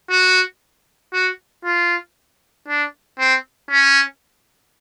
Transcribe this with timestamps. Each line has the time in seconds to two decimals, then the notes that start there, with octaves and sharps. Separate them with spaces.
0.10 F#4
1.13 F#4
1.65 F4
2.68 D4
3.19 C4
3.71 C#4